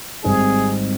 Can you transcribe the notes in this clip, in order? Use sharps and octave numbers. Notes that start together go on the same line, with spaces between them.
G#1 G#2 G3 C4 D#4 G#4